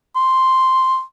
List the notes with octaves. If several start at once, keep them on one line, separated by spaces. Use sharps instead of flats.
C6